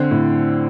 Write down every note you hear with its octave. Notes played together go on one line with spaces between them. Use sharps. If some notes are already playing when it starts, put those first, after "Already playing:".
Already playing: D3 C4
A2